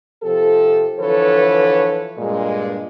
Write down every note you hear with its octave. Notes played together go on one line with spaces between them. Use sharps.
C3 F3 G4 A4
D3 E3 F3 A4 B4 C#5
G2 A#2 G#3